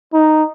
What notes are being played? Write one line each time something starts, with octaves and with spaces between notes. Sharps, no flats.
D#4